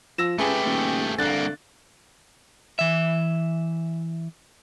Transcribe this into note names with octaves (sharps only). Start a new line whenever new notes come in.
F3 E6 A#6 E7
C#2 A3 G4 G#4 B4
D#1
C2 D3 A#3 F#6 A6
E3 E5